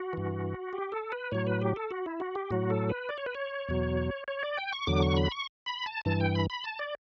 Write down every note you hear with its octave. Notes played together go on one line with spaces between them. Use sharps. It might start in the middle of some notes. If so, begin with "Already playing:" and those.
Already playing: F#4
G2 E3
G4
A4
B4
A2 F#3 C#5
B4
G4
A4
F#4
E4
F#4
G4
A2 F#3 F#4
A4
B4
D5
C#5
B4
C#5
E2 B2 F#3
C#5
D5
G5
C#6
E2 D3 F#3 D6
C#6
B5
C#6
B5
A5
G2 E3 A5
G5
B5
B5
A5
D5